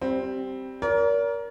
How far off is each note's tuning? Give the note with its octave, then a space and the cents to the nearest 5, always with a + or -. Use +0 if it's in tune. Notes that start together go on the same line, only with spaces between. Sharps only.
G3 -10 C4 +0
A#4 +15 D5 -45